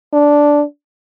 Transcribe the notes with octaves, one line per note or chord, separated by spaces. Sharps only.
D4